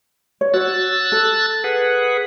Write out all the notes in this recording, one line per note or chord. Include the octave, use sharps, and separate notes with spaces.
C#5
F#4 C#5 E6 F#6 A6
A4
G#4 B4 F#5